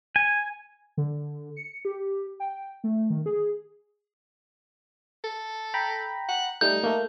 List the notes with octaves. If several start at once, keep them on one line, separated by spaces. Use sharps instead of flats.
G#5
D3
C#7
G4
G5
A3
D#3
G#4
A4
G5 A#5 B5
F#5
G3 A3 D#4 G6
A3 A#3